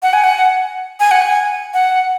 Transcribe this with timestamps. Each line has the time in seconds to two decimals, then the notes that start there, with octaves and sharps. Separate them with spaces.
0.03 F#5
0.13 G#5
0.24 F#5
1.00 G#5
1.11 F#5
1.22 G#5
1.74 F#5